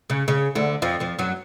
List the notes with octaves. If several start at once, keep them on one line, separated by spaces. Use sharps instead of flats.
C#3
C#3
D2 D3
F2 F3
F2 F3
F#2 F#3